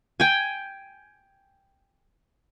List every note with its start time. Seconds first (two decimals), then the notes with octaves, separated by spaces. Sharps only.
0.20 G5 G#5